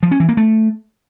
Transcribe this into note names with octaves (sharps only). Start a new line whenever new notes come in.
F3
C#4
E3
A#3
A3